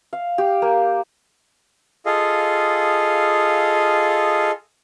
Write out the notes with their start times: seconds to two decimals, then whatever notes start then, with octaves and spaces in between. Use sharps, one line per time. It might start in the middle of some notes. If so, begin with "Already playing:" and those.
0.13 F5
0.38 G4
0.62 A#3
2.06 F4 G#4 A4 D#5 F5